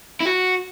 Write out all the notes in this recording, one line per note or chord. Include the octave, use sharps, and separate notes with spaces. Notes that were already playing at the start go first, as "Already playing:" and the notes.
E4
F#4